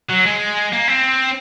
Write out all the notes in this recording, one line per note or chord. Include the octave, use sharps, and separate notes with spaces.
F#3
G#3
A#3
C4